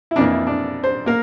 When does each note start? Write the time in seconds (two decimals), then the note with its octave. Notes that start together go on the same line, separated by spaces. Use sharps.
0.11 E4
0.16 F2 E3 A#3 D4
0.32 E4
0.47 D4
0.84 C5
1.06 A#3 A#4